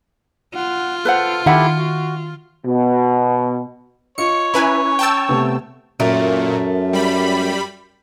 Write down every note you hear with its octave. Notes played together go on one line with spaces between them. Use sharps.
F4 F#5
A4 B4 C5 F#5
D#3 E4 G4 A4 E5 F#5
F#4
B2
F4 C#5 D#5 C#7
C#4 E4 B4 G#5 A#5
G5 A5 E6
C3 A3 B3
F#2 A#2 A3 A#4
G3 B5